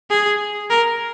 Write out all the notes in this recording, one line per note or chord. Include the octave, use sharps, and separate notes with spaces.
G#4
A#4